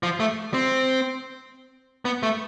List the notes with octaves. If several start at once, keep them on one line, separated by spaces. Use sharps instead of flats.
F3
A3
C4
B3
A3